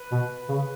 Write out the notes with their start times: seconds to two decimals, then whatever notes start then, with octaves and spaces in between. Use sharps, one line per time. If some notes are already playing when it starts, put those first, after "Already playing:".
Already playing: B4
0.12 B2
0.49 C#3